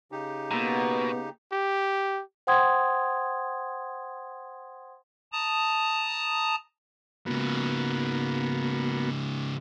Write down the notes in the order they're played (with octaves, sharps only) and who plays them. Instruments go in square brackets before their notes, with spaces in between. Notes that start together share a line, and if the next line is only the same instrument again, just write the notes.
[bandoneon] C#3 D#4 G4
[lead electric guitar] B2 [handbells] A#3 A#5 [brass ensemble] B3
[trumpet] G4
[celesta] C5 F#5 G5 C6 D#6 G#6
[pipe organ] A5 A#5 D#6
[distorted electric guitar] G#2 C#3 [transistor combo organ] A#3 B3 F#4